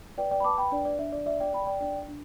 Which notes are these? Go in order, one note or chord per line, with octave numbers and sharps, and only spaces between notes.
B4 D5 G5
D5 G5
B5
B4 A5 D6
G5 B5
D4 D5 G5
D5
D4 E5
D5
D5 E5
D5 G5
D5 G5 B5
D5 G5
D4 D5 G5
D4